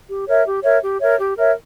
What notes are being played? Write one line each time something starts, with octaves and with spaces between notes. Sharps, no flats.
G4
A#4 C#5 E5
G4
A#4 C#5 E5
G4
A#4 C#5 E5
G4
A#4 C#5 E5